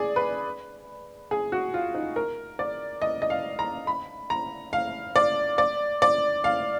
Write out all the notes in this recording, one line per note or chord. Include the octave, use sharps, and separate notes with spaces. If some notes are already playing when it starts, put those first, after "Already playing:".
Already playing: G#4 D5
B4
G#4
F#4
F4
D#4
A#4
D5
D#5
D#5
F5
A#5
B5
A#5
F5
D5
D5
D5
F5